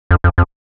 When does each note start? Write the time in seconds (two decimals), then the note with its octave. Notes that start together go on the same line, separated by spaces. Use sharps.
0.11 F2
0.24 F2
0.38 F2